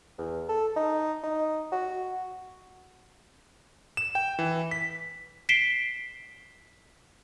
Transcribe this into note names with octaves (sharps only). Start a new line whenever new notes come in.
E2
A4
D#4
D#4
F#4
E7
G5
E3
B6
B6 C7 D7 E7 G7